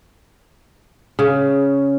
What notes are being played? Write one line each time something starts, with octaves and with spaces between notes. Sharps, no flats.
C#3